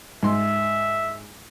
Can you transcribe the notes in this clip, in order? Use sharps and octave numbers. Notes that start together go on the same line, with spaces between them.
G#2 E5 C6